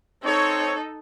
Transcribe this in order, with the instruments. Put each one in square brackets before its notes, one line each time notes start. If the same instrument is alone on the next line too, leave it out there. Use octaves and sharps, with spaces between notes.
[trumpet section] C4 C#5 [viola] D#4 A4